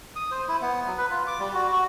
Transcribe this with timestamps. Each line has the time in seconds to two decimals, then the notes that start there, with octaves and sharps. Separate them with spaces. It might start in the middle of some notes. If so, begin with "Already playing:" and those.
0.16 D#6
0.31 C5
0.48 E4
0.61 B3
0.86 F#3
0.98 B4
1.10 F4
1.27 D6
1.40 G3
1.54 F#4
1.73 F#4